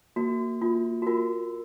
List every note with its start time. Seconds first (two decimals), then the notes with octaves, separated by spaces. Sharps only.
0.16 A#3 F#4
0.61 A#3 F4
1.02 F#4
1.07 F4 A#4